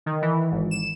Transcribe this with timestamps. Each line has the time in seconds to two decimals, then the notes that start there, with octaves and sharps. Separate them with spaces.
0.06 D#3
0.22 E3
0.51 G#1
0.71 E7